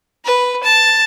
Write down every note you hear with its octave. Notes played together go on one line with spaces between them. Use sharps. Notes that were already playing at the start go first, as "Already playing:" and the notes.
B4
A5